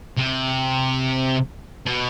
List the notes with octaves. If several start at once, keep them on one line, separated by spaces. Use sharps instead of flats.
C3
B2